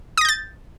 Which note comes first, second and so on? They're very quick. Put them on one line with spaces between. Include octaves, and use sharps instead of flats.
D#6 A#6 G6 A6